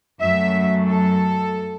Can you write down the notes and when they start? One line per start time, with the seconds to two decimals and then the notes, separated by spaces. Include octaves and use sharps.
0.21 F#2 F#3 A3 E5
0.88 A4